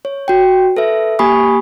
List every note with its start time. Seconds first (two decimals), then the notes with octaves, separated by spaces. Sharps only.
0.05 C#5
0.28 F#4 G5
0.77 A4 B4 E5
1.19 A#3 G4 G#5 B5 C#6 D#6